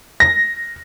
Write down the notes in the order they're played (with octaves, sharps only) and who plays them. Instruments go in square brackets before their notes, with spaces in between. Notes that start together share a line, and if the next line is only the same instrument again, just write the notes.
[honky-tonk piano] A#6